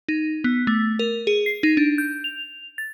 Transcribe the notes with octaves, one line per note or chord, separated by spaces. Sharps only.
D#4
B3
A3
A#4
G#4
C7
D#4
D4
G6
F7
A6